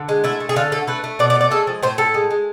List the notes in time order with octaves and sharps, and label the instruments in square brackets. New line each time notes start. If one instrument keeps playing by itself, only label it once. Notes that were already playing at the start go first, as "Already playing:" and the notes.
Already playing: [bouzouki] D3
G#3
A3 E4
A3
G#4
D3 F4
A3 A4
A3 B4
A3
B2 D5
D5
A3
D5
G#3 A4
F3
A2 C5
A2 A4
G#3
G#3